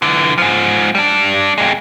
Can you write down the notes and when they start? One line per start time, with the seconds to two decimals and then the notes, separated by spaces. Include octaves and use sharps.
0.02 D3 E3
0.38 G#2 F3
0.95 G3 D4
1.58 F2 G#3